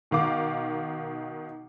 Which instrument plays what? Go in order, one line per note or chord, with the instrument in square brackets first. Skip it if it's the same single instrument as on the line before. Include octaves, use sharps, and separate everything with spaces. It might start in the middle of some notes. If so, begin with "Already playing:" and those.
[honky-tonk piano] B2 D#3 F5 D6